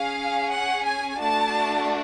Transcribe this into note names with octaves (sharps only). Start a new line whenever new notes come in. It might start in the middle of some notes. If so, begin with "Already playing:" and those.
Already playing: C#4 G#4 F5
F#5
G#5
A3 D4 F#4 A5